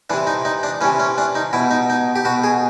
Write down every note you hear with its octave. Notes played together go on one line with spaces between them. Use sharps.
C3 E3 D4
D#4
D#4
D4
C3 E3 C#4
C#4
D4
D#4
B2 E4
D#4
D#4
G4
B2 F#4
G#4